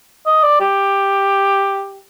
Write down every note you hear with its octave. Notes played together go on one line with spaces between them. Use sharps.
D#5
D5
G4